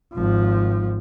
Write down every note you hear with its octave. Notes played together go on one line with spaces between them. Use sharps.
G#1 F3